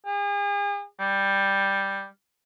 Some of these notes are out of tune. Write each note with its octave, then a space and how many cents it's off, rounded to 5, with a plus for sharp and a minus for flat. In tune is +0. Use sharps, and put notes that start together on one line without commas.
G#4 -40
G3 +5